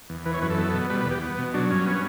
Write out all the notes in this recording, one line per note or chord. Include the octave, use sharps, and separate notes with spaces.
E2
E3 B4
C#5
F#2 B4
A4
B3
B2
G3 B4
B4
E2
G4
B3
B2
F#3 D4
G2 C#4
B3